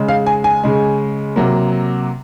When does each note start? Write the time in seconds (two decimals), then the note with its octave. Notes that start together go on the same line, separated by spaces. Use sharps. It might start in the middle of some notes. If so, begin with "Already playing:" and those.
Already playing: C#3 G#3
0.08 F5
0.26 G#5
0.44 G#5
0.63 C#3 G#3
1.36 C3 F#3 A#3